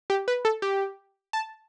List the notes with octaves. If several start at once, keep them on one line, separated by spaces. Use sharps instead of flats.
G4
B4
A4
G4
A5